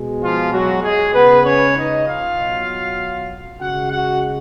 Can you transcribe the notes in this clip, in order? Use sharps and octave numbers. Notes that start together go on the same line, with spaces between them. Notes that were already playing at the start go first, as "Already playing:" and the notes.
Already playing: B2 G#3
F3 F4
F#3 F#4
G#3 G#4
C#3 G#3 B3 B4
C#4 C#5
D#4 D#5
F4 F5
B2 F#3
C#3 G#3 F#4 F#5
F#4 F#5